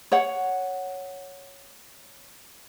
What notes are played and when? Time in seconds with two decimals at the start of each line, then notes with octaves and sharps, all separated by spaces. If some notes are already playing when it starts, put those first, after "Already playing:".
0.12 C#5 F#5